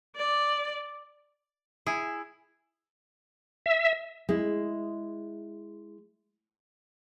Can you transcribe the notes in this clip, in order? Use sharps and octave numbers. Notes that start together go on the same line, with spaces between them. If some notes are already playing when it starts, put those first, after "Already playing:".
D5
E4 G#4
E5
G#3 E4